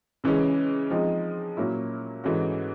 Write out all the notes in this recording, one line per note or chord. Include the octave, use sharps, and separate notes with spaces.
C#3 E3 G#3 C#4
F3 G#3 C4 D#4
A#2 F#3 A#3 C#4 E4
G#2 E3 A3 C#4 F#4